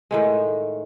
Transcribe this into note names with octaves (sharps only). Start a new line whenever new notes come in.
A2 D#3 G#3